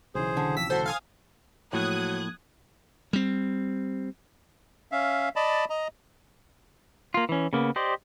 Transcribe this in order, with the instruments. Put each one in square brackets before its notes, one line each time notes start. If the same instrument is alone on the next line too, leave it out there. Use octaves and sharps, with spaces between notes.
[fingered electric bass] B1 C#3 E3 [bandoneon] G#4 C5
[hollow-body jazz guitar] D3
[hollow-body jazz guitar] F2 [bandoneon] E6 [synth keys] B6
[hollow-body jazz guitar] D2 F#4 [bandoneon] A4 [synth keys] C5
[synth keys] F5 G#5 D#6
[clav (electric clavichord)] A2 [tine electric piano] F3 A#3 [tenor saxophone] F#3 [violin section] D#6 F#6 G#6
[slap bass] G3 C4
[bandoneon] C#4 E5 F5
D5 D#5 A5 B5
D#5 A#5
[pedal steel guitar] A#3 F4
E3 C#4
C#3 A#3 B3
G4 C5 D5 D#5